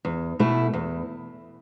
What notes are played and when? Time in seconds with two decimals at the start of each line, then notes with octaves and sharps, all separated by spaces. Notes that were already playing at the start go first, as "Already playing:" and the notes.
0.05 E2
0.39 B2 A3 E4
0.73 E2